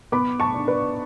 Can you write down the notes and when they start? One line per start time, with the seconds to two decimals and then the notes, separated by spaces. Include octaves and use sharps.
0.12 B3 B5 D6
0.40 A5 C#6
0.54 D4
0.68 B4 D5